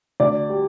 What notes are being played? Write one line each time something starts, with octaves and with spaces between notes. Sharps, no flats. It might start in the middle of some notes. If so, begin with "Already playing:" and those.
D2 D5
G3